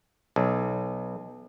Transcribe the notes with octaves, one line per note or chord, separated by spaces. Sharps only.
B1